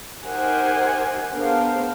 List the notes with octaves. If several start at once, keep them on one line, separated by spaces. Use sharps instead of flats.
D#4 G4 A#4 C5 F#5 G#5
B3 D4 G#4 A#4 C5 F5